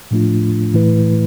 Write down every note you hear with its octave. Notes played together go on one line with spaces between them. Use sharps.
A2 F3 A3 D4 F4
A2 E3 A3 E4 B4